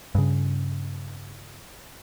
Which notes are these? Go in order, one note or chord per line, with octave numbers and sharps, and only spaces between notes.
G2 C#3